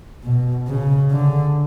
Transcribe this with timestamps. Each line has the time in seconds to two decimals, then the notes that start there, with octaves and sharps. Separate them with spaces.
0.24 B2
0.68 C#3
1.11 D3